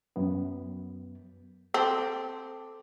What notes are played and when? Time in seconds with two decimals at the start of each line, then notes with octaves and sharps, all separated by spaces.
0.16 F#2 B3
1.74 C4 A4 D6